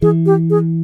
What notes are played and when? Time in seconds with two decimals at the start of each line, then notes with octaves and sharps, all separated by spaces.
0.02 E3 G#4
0.26 G4
0.50 G#4